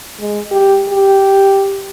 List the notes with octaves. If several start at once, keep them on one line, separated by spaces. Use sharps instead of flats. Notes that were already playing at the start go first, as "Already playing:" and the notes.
G#3
G4
G4